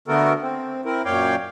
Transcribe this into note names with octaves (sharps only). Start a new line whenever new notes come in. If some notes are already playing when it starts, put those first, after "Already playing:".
D3 A3 B3 F#4 A4 A#4
C4
C4 E4 A#4
F#2 A#2 C#5 D5 F5 G5